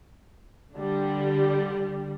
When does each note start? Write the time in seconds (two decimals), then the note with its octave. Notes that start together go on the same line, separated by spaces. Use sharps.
0.73 D3 G3